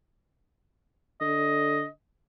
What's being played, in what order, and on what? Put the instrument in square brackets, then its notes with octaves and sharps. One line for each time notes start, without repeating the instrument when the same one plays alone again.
[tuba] D3 [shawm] D#5